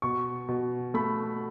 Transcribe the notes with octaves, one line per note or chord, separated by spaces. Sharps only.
B2 C#6
B2
A3 B5